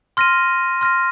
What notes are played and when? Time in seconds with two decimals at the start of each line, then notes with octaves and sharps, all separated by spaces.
0.17 C6 F6 A#6 D#7
0.81 C6 F6 A#6 D#7